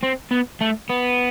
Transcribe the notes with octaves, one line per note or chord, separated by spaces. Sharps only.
C4
B3
A3
B3